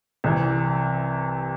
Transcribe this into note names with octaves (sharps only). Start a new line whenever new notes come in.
C2 C3 E3